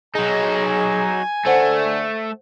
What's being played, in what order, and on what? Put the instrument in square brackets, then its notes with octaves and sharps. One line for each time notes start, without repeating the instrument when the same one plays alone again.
[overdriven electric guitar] F#3 D#4 [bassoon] G#4 [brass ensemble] G#5
[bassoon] D3 [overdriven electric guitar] A3 [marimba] C5 F#5